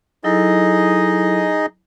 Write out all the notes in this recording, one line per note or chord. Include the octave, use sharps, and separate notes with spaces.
F#3 D#4 E4 G#4 A4 D#5